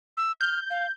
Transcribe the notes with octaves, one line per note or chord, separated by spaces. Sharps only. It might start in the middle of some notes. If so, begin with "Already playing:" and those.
E6
F6 G6
F5